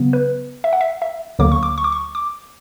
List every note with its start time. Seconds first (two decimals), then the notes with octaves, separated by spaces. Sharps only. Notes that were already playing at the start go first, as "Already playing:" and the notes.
Already playing: C#3 F#3 B3
0.13 B4
0.64 E5
0.73 F#5
0.81 E5
1.02 E5
1.39 D2 D3 F#3 A#3 D6
1.52 C#6
1.63 D6
1.78 C#6
1.84 D6
1.92 C#6
2.15 D6